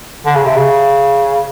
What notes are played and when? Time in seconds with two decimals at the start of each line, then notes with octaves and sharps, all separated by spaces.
0.26 D3
0.35 C#3
0.46 C3
0.57 C#3